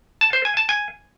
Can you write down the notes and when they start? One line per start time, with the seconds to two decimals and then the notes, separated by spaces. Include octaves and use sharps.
0.21 A5
0.33 C5
0.45 G#5
0.57 A5
0.69 G#5